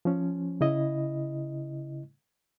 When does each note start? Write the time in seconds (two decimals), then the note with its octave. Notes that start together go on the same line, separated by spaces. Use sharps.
0.05 F3 C#4
0.61 C#3 E4 D#5